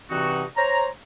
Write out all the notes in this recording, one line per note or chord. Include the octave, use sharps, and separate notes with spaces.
G2 C3 E3 C4 D#4 F#4
C5 C#5 A#5